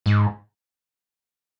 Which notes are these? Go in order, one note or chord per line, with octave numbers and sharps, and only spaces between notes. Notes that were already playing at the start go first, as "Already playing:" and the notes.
G#2